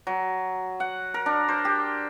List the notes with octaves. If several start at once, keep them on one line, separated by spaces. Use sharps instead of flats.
F#3
F#5
A#4
D4
C5
G4